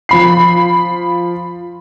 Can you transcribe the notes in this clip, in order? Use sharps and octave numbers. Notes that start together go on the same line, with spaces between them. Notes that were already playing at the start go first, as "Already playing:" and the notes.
F3 B5 C7